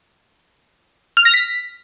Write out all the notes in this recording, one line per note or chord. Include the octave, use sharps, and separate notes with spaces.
F6
A#6
B6